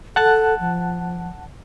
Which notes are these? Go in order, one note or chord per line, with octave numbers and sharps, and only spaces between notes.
A4 F#5 A5 F#6
F3